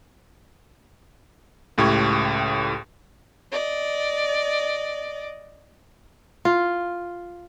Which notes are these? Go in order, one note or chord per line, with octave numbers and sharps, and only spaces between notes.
C#2 A2 G4 C#6 G#6
D5 D#5
F4